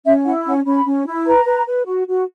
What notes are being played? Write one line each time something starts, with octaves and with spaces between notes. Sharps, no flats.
C#4 E5
E4 F#5
C#4 F#5
C#4 B5
C#4
E4
B4 A#5
B4
B4
F#4
F#4